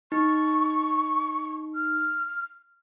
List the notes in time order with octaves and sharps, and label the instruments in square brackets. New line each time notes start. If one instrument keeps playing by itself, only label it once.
[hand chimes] D#4 [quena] C#6
[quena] F6